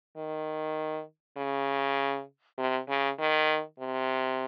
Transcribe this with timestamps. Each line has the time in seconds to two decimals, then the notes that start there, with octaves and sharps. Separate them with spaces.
0.17 D#3
1.37 C#3
2.58 C3
2.89 C#3
3.19 D#3
3.80 C3